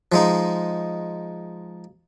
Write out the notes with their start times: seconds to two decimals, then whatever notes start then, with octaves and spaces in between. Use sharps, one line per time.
0.12 F3 G#3 D#4